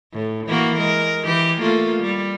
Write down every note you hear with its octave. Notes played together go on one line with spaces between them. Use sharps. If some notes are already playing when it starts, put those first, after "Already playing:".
A2
E3 A#3 F#4
G#3 A#4
E3 G4
A3 A#3 F4
G3